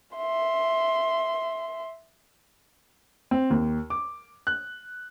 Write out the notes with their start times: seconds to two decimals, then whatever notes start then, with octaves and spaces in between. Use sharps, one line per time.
0.16 E5 C6
3.31 C4
3.50 D#2
3.90 D6
4.47 F#6